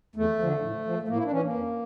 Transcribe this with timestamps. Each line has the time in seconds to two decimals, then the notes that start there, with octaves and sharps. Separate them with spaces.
0.16 E2 A3
0.39 D3 F3
0.62 A2
0.85 F3
1.03 A3
1.08 A2 A#3
1.16 E4
1.24 D4
1.31 E3 C#4
1.43 A#3
1.54 F2